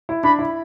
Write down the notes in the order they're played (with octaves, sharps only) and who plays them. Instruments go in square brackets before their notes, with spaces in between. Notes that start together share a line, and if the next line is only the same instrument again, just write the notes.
[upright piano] E4
[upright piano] D4 [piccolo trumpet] B5
[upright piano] E4